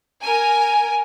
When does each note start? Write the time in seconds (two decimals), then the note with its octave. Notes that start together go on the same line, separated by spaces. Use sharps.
0.23 A#4 G#5